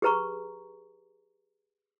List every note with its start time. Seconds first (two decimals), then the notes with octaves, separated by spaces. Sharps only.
0.02 G4 G#4 B4 A#5 C#6